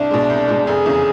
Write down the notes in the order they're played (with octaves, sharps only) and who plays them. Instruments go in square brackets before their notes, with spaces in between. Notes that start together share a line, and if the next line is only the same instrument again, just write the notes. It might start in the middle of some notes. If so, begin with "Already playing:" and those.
Already playing: [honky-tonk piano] C2 [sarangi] D4
[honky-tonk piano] B2 G#3
C2
B2 G#3
[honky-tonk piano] F1 [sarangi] G#4
[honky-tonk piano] E2 C#3